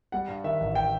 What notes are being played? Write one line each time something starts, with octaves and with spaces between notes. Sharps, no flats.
G3 F#5
G2
D#3 E5
A1
G5